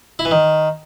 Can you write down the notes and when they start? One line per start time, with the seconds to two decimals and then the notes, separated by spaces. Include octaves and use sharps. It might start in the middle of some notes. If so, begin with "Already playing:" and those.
0.19 E4
0.25 E3
0.31 D#3